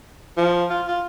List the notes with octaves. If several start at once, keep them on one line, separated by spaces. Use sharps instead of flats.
F3
F4
F4